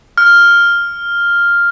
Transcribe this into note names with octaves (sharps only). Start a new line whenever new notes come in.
F6